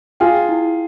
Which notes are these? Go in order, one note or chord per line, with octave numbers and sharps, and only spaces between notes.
F4 G#4 G5
E4